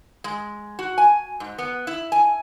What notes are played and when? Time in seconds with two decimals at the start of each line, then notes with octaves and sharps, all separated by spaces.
0.24 G#3
0.79 F#4
0.98 G#5
1.40 G#2
1.58 B3
1.87 E4
2.12 G#5